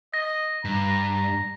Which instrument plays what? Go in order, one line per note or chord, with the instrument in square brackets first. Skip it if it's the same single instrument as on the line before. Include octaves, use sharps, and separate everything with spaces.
[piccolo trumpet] D#5 [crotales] A#6
[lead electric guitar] G2 [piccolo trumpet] A#5